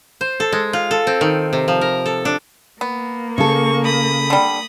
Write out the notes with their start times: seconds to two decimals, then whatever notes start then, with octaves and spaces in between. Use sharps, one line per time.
0.21 C5
0.40 A4
0.52 G#3
0.73 F4
0.91 A4
1.07 C4
1.21 D#3
1.53 C3
1.68 F3
1.81 A#4
2.06 A4
2.25 D4
2.81 A#3 B3
3.38 C#3 A4 C#6
3.84 B5 D#6
4.30 D3 G3